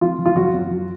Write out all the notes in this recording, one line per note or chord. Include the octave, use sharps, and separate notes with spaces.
F3 F4
F3
F4
F#2 F#4
F#2
F#3